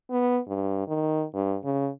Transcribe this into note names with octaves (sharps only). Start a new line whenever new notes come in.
B3
G2
D#3
G2
C#3